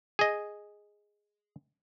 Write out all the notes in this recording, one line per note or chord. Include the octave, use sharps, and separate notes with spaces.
G#4 D#5